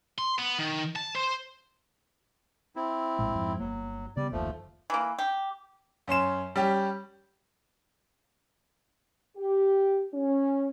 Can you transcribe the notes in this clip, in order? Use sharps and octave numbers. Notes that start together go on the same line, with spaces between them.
C6
B3
D#3
A5
C5
C4 E4
A#1 A2 G#3
F2 G#2
G1 F#3 A#3
C#3 G3 B3 D5
F#1 D#2 F3 A3
E3 A#3
G4
F#2 C#4 C6 E7
G3 C#4 G4
G4
C#4